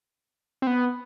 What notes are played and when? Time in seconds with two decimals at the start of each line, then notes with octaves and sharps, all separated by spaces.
0.62 C4
0.67 B3